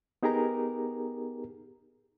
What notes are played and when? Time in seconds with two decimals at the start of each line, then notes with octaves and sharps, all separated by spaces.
0.23 B3 D#4 G4 G#4 A#4 A#5